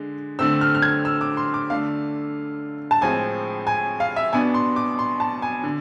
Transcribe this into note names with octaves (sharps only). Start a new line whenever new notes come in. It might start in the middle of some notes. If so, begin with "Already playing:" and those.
Already playing: D3 G#3
D3 A3 C4 E6
F6
F6
G#6
E6
D6
C6
D6
D3 A3 D4 F5
A5
A2 F3 G#3 C4 G#5
G#5
F5
E5
B2 B3 D4 G#5
C6
D6
C6
A5
G#5
D3